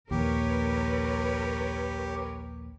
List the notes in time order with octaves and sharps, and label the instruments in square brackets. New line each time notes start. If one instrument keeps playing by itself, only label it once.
[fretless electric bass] A#1 D#2 [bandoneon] G4 [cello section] A#4 B4 C#5